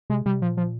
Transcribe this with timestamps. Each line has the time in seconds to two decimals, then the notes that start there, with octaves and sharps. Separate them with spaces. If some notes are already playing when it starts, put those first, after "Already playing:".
0.10 C3 G#3
0.26 C3 G3
0.41 A#2 F3
0.57 F3